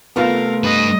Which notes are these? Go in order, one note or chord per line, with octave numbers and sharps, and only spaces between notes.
C3 A3 B3 F4 A4 A#4 F5
G2 B4 D#5